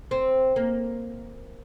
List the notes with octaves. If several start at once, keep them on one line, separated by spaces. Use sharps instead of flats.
C4
A#3